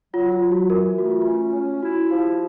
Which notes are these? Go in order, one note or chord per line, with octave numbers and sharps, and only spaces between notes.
F#3 F4
F4
F#3
F#4
E3 A#4
A3 F#4
F4
C#4 F4
C#4
E4 F#4
F3 G4